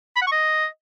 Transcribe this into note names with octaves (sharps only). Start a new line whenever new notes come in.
B5
F#5
C#6
D#5